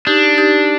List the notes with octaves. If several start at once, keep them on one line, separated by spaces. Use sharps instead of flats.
D4 D#4 G4
D#4 G4